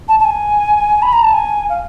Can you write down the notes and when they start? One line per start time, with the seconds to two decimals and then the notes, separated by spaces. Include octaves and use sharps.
0.08 A5
0.19 A5
0.24 G#5
1.02 B5
1.12 A#5
1.23 A5
1.33 G#5
1.69 F5